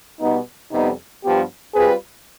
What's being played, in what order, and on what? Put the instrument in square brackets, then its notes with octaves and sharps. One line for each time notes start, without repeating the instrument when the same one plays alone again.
[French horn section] B2 G3 B3 [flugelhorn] D#4
[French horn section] F2 C3 G3 B3 [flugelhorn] D#4
[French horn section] G2 F3 B3 [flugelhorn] G4
[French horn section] G3 C4 F4 B4 [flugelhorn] G#4